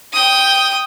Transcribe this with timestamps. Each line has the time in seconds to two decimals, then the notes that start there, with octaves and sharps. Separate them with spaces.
0.13 G5 D#6